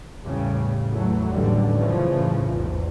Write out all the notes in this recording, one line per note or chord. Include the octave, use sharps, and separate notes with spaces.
E2 A2 C#3 G3
E2 E3 F#3 A3
A1 D#2 D3 E3 G3
F#2 A2 C#3 E3 F3
A#1 E2 G#2